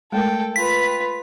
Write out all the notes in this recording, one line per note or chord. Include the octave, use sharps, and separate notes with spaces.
G#3 A3 A4 A#4 G5
F4 B4 B6